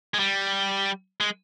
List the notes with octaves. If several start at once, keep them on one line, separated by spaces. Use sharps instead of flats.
G#3
G3
G#3